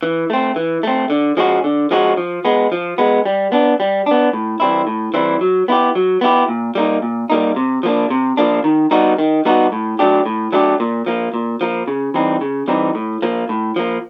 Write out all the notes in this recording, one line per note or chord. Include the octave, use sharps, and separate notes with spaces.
E3
A3 C4
E3
A3 C4
D3
F3 G#3 C#4 F#4
D3
F3 G#3 C#4 F#4
F3
G#3 B3
F3
G#3 B3
G3
B3 D4
G3
B3 D4
A2
E3 G3 C4 E4
A2
E3 G3 C4 E4
F#3
B3 E4 G4
F#3
B3 E4 G4
A#2
G3 A#3 D#4
A#2
G3 A#3 D#4
C3
F3 A#3 D4
C3
F3 A#3 D4
D#3
G3 B3 D#4 F#4
D#3
G3 B3 D#4 F#4
A2
F#3 A3 D4 G4
A2
F#3 A3 D4 G4
A#2
F3 A#3
A#2
F3 A#3
C#3
E3 G3 C4 D#4
C#3
E3 G3 C4 D#4
A2
F3 A#3
A2
F3 A#3